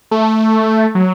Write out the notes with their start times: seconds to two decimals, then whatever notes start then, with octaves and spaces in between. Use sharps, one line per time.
0.11 A3
0.95 F#3